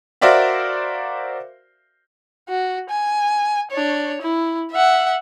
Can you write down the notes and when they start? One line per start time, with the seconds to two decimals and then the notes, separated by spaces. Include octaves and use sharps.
0.21 F#4 A#4 C5 D5 E5 F5
2.49 F#4
2.89 G#5
3.71 D4 C#5
4.22 E4
4.71 E5 F#5